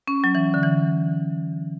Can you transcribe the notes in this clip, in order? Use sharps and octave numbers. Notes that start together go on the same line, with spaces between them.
C#4
F#3
E3
D3
E3